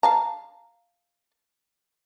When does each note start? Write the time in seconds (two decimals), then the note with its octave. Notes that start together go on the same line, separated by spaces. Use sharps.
0.03 F5 A5 A#5